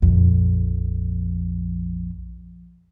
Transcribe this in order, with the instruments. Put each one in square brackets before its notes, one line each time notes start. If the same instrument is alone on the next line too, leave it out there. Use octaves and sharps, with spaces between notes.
[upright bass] A#1 F2